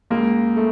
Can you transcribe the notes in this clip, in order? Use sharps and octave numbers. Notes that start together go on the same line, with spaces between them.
C#2 A#3
A3